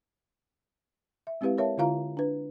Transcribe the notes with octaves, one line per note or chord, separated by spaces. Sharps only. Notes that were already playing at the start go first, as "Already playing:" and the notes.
E5
G#3 C4 E4 G4 B4 F5
A#4 C#5 E5 F5 A5
D3 E4 F4 F5 A#5
D4 B4